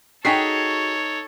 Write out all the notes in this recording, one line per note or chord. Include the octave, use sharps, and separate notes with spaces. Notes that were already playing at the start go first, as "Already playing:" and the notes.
D#4 F#4 G#4 A4 C#5 G5 B6 C7